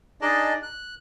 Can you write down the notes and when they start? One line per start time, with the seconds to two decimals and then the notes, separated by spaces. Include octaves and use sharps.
0.21 D4 D#4 G#4 D5 D#5 A5
0.63 F#6